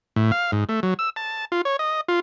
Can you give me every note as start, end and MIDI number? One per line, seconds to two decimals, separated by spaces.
0.16 0.31 45
0.32 0.51 77
0.52 0.64 44
0.69 0.80 57
0.83 0.94 54
0.99 1.10 88
1.16 1.45 81
1.52 1.61 65
1.65 1.77 73
1.79 2.01 75
2.08 2.20 65